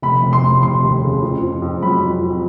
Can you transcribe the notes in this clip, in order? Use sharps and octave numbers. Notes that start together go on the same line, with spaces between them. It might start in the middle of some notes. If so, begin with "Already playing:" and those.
F1 B5
F1
C6
F1
F1 C6
D#2
C#3
F2
F2
F2
F#3 B5
F2
F2